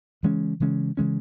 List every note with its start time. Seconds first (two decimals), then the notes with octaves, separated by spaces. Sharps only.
0.23 C#3 E3 G#3 C#4
0.60 C#3 E3 G#3 C#4
0.97 C#3 E3 G#3 C#4